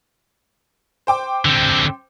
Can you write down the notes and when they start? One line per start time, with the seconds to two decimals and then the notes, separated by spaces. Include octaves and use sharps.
1.07 C5 G5 D6
1.45 D3 C4